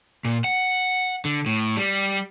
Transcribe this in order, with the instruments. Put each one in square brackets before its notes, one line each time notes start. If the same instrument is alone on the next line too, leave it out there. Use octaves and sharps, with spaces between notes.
[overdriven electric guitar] A#2
F#5
D3
A2
G3